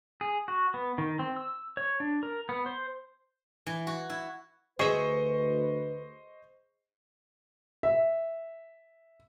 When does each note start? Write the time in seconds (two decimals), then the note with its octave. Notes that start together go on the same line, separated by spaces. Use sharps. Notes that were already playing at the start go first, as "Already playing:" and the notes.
0.21 G#4
0.48 F#4
0.74 B3
0.98 D#3
1.19 C4
1.36 E6
1.77 C#5
2.00 D4
2.23 A#4
2.49 B3
2.66 C5
3.67 E3
3.87 F#4
4.10 E4
4.79 D2 G#4 B4 C5 D#5 E5 C#6
7.83 E5